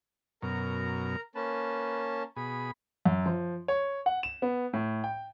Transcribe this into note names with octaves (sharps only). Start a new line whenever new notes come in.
F#2 B2 A#4 A#5
A#3 C#4 B4 A5
B2 G#4 B5
F#2
F3
C#5
F#5
E7
B3
A2
G5